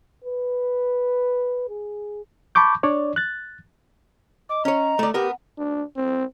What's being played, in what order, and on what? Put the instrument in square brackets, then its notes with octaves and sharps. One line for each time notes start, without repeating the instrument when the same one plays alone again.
[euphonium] B4
G#4
[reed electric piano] A5 B5 C#6 D6 G6
D4 C#5 D5
F#6 A6
[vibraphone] D#5 [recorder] D6
[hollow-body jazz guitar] C#4 C#5 [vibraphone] D#5 [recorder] A#5
[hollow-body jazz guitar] A3 D5
[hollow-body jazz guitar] B3 A#4 [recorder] G4 [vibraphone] F#5
[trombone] D4
C4